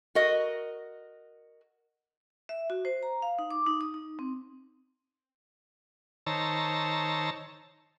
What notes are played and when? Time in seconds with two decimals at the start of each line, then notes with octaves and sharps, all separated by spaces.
0.15 F#4 A#4 D#5
2.49 E5
2.70 F#4
2.85 C5
3.03 A#5
3.22 F5
3.39 D#4
3.51 D6
3.66 D#4
3.81 D#6
3.94 D#4
4.19 C4
6.27 D#3 C5 C#5 A5 A#5 E6